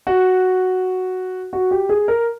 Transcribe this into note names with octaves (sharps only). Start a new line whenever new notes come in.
F#4
F#4
G4
G#4
A#4